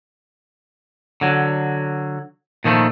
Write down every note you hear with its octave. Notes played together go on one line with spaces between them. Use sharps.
D3 F#3
A#2 D#3 F3 A3